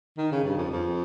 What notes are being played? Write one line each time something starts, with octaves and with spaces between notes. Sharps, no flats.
D#3
C#3
G2
F2
F2